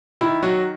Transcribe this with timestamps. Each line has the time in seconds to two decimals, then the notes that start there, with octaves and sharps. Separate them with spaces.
0.21 D#3 E4
0.43 F#3 F#4